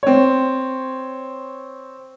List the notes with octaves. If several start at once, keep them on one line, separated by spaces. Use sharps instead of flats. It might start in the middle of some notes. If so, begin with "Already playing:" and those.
C4 C#5